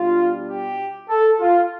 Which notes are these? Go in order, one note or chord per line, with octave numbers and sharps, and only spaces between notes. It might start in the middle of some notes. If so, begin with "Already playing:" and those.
Already playing: B2 G3 D4 F4
G4
A4
F4